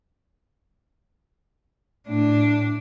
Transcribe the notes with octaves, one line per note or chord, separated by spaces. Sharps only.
A2 D4